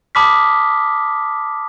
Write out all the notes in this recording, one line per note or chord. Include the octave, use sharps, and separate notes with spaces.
A5 B5 D6 D#6 F6 B6